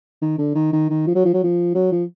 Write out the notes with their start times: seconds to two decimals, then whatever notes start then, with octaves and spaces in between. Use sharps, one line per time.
0.22 D#3
0.38 D3
0.55 D#3
0.73 D#3
0.90 D#3
1.07 F3
1.15 F#3
1.25 F3
1.34 F#3
1.44 F3
1.74 F#3
1.92 F3